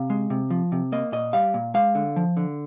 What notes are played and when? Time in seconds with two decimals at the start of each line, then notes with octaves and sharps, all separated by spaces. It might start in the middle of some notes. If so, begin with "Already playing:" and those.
Already playing: C3 F5
0.10 G#3
0.30 C3
0.50 F3
0.72 C3
0.92 A#3 D#5
1.12 A#2 D#5
1.33 G3 F5
1.54 A#2
1.74 G#3 F5
1.95 D3
2.16 F3
2.37 D3